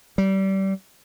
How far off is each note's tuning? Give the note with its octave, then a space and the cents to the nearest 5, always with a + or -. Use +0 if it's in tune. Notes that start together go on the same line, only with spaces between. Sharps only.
G3 -25